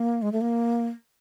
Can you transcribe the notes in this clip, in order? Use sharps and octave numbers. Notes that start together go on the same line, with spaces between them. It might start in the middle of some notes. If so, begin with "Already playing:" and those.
Already playing: A#3
G#3
A3
A#3